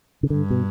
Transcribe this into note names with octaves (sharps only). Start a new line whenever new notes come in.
C#3
G2 D3
B2